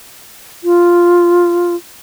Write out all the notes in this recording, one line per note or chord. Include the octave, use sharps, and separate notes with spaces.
F4